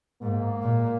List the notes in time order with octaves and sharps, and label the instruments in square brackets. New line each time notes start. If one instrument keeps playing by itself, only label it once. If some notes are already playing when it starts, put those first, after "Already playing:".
[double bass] G#2 [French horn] A#3
[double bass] A#2